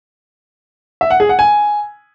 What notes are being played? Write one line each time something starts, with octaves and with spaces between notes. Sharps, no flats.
E5
F#5
G#4
F#5
G#5